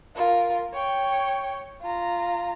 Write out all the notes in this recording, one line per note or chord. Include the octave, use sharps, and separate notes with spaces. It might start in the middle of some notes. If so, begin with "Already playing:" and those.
F4 A#4
C#5 G5
F4 A#5